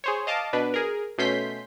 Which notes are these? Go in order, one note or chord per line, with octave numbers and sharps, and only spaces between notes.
G#4 C5 C#5
D#5 F5 A5 D6
B2 D4 B4
G#4 A#4
B2 A3 C#4 C6 G6 B6